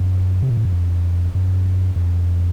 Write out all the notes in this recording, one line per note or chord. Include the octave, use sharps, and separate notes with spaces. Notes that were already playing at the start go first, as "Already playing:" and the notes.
Already playing: F#2
C3
A#2
A2
F#2
F2
F#2
F2